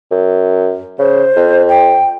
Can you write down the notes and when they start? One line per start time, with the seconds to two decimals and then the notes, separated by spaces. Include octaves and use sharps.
0.11 F#2
0.99 C#3 C5
1.36 F2
1.68 G5